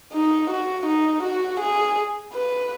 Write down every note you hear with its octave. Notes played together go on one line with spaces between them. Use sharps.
D#4
F#4
D#4
F#4
G#4
B4